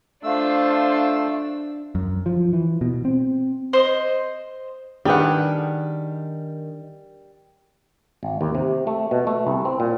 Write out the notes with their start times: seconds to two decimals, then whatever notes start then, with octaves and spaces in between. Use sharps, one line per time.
0.23 A3 D4 F4 C5 F5 E6
1.95 F#2
2.26 F3
2.53 E3
2.81 B2
3.05 C4
3.73 C5 D#5
5.05 D#3 G3 D4 G4 G#4 B4 F#5
8.23 G#1
8.41 D#2
8.55 C3
8.87 A3
9.11 B2
9.27 A3
9.47 C2
9.65 C4
9.80 A#2